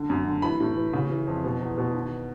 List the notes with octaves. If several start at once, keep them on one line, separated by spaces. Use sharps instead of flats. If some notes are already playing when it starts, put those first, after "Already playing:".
Already playing: D3
F#2
D3
E3 B5
A2
E3
C#3
E3
F2
B2
E2
B2
D#3